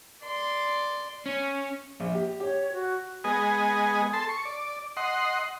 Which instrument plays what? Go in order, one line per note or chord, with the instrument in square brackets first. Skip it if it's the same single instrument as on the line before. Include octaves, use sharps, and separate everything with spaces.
[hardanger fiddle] D5 C6
[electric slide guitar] C#4
[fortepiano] A#1
G4
[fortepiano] G4 [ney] C#5
[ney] F#4
[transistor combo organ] G#3 B3 D#5 G#5
A4 A5 C6
C#6
D5
D#5 F#5 C6